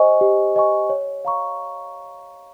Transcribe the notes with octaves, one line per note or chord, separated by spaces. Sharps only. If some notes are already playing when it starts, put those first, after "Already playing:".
Already playing: G4 C5 D#5 G#5 C#6
G4
C5 D#5 G#5 C#6
C#5
F5 A#5 C#6